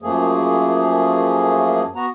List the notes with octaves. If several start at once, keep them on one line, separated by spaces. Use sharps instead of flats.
F#2 F3 A3 A#3 G#4
B3 F#4 A#5